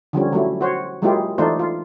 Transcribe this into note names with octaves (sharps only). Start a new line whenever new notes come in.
D3 F3 G3 C#4
F#3 A3 E4
F#4 C5 C#5
F#3 G#3 A#3 E4 F4 G4
E3 A3 D4 D#4 F4 C5
F4